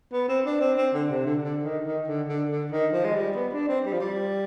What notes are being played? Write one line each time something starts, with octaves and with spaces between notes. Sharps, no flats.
B3
C4
D4
C4
C4
D3
C3
D3
D3
D#3
D#3
D3
D3
D3
D#3
F3
G#3
G3
B3
D4
C4
G3
F3
G3